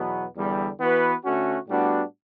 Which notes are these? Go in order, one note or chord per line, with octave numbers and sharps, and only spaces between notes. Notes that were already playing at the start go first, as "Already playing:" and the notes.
Already playing: E2 B2 F#3 B3
E2 D3 G3
E3 B3 F#4 B4
D3 A3 C#4 F#4
A2 G3 B3 D4 F#4